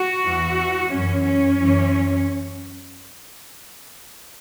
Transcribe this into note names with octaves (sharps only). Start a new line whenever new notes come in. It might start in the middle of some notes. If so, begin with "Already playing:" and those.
Already playing: F#4
E2 E3
F#2 E3 C#4
C#4
F#2 E3